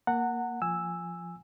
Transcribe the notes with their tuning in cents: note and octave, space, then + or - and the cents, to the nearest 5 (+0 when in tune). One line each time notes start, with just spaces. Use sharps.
A#3 +0 F#5 -5 A#5 -35
F3 +0 G#5 -10 E6 +0